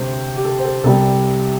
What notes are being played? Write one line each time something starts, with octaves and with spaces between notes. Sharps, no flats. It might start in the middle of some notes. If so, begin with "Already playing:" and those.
Already playing: D2 C3 A3 C5
G4
A4
C5
A4
C2 C3 G3 A4